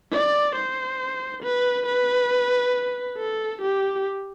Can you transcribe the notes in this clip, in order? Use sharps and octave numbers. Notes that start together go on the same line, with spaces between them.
D5
C5
B4
B4
A4
G4